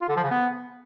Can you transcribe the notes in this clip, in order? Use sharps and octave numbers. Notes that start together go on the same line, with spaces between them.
F4
D3
F3
C#3
B3